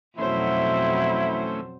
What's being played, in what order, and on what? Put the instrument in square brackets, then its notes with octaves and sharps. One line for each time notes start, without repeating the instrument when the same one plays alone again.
[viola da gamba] F2 B2 F#3 [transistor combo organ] E3 A3 C#4 [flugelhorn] E4 [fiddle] C5